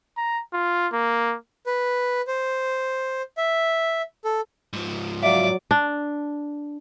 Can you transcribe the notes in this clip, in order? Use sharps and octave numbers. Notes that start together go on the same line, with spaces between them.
A#5
F4
A#3
B4
C5
E5
A4
G#2 F3
F#3 D5 E5 F5 D6
D4